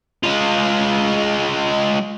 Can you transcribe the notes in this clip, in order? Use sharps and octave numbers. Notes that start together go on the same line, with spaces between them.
G#3 F4